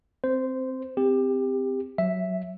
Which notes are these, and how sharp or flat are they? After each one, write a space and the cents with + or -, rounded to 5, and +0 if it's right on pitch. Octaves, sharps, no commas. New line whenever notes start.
C4 +0 C5 -15
C4 -20 G4 +20
F#3 +0 E5 +0